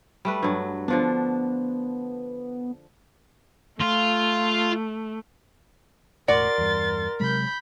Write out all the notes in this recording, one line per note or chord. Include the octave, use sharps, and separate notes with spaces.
G3 A3 B4
G2 F#3
D3 F3 B3 D4
A3 F4
E1 A2 F#4 A#4 D5 C6 A6
E2 G2
C3 F#3 G#3 B5 G6